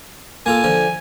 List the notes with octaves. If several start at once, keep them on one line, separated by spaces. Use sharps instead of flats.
A#3 F4 A4 G#5
D3 F3